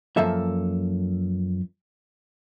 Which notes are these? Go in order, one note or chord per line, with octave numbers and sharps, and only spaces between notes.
F#2 F3 A#3 A4 E5